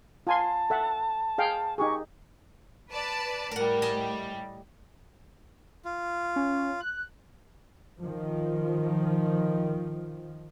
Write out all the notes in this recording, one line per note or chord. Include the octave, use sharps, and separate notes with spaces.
F4 G#5 A5 C6
A4 E5 F#5
G#4 F5 G5
D#4 G4 G#4 C#6
B4 D5 A5
A2 G3 A#4 F#5
D#5 G#5 A5
F4
C#4
F#6
D#3 F3